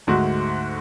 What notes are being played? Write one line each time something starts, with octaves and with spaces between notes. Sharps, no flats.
D2 G#2 A3 F#4